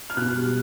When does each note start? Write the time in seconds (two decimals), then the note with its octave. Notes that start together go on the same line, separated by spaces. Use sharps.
0.10 F6
0.17 B2 F#6
0.35 G3